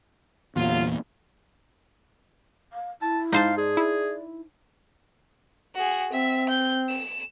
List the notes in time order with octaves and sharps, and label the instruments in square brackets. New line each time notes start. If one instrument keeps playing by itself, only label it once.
[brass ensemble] G1 F#3 F4 [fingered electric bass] E2 A#2
[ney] F5
[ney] E4 [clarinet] A5
[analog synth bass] G#2 [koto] D#4 C5 A5 [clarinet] F5
[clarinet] G#4 [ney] D5
[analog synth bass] E4
[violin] F#4 G#4
[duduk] C4 [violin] E5
[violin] G6
E7